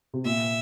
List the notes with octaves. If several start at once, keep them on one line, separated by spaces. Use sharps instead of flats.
C3
A#2 E5